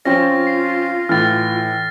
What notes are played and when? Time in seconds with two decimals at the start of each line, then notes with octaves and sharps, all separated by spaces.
0.05 F3 C4 C#4 F4 A#6
0.47 C7
1.09 A2 E3 F6 A6